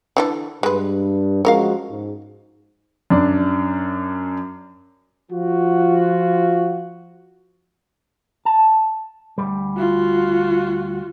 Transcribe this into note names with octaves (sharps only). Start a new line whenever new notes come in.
D3 E3 A4
G2 G#3 B4
F3 G#3 C#4 F#4 A#4 F5
G#2
F#2 D4
F3 F4 F#4
A5
D2 G#2 G3
F4 F#4